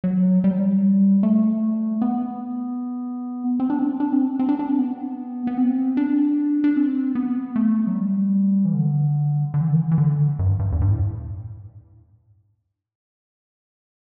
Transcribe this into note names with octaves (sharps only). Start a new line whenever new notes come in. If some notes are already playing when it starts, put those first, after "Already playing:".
F#3
G3
F#3
G3
A3
B3
C4
D4
C4
D4
C4
C4
D4
D4
C4
B3
B3
C4
D4
D4
C4
B3
A3
F#3
G3
E3
D3
D3
E3
D3
E3
D3
E3
D3
F#2
G2
G2
E2
G2
A2